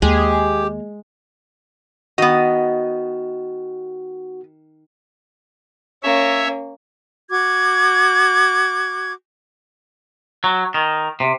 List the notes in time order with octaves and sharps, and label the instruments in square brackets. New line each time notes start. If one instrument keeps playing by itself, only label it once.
[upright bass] D#2 A#3 [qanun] G#3 [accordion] G4 [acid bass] G#4
[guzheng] D#3 [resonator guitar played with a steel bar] B3 D#5 [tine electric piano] F#4
[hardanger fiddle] A#3 C#4 [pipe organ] C#5 E5
[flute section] F#4 D6 G#6
[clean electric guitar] F#3
D#3
C3